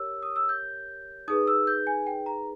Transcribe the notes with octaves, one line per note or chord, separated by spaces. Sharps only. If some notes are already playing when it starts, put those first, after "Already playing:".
Already playing: G4 A#4 C#5 E6
D#6
E6
G6
D#4 G#4 B4 D#6
E6
G6
G#5
G5
A#5